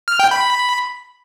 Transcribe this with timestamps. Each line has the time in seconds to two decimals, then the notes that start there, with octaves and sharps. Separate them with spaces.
0.08 F6
0.19 G5
0.31 B5